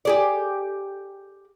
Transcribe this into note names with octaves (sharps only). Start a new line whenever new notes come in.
G4 G#4 D5